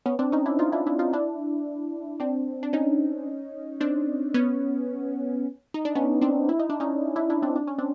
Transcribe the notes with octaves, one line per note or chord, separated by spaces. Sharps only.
B3 C#4
C4 D4
C#4 D#4
D4 E4
D#4 F4
D4 E4
D4 E4
D#4 F4
D4 E4
C4 D4
D4
C#4 D#4
C4 D4
B3 C#4
D#4
D4
B3 C#4
C4 D4
E4
D#4
D4
C#4 D#4
D4 E4
D4 E4
C4 D4
D4
C#4
C4 D4